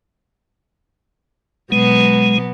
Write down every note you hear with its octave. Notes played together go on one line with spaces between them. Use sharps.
B2 F#3 G#3 B3